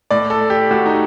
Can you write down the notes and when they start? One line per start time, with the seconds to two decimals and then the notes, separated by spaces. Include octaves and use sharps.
0.11 A2 D5
0.30 A4
0.50 G4
0.71 A2 F#4
0.86 D#4